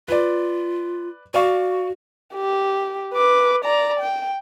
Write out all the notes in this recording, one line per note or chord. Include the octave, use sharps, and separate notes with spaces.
F4 B4 D5
F#4 D5 F5 C#6
G4
B4 D6
D5 A#5
G5